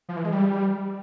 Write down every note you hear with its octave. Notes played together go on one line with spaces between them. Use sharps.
F3
E3
G#3
G3